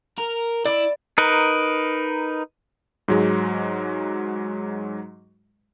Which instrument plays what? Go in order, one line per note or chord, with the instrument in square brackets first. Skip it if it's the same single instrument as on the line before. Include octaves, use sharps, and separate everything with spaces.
[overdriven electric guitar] A#4
[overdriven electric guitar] E4 [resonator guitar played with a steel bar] D5
[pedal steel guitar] D#4 A#4 B4
[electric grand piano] G#2 F#3 G#3